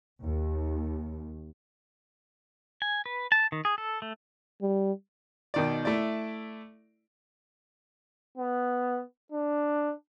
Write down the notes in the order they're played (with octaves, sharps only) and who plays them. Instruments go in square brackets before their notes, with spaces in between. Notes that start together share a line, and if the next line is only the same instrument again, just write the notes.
[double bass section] D#2
[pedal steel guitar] G#5
B4
A5
D#3
G#4
A4
A3
[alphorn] G3
[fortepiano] B2 D#3 D5
A3 E4 D5
[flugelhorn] B3
D4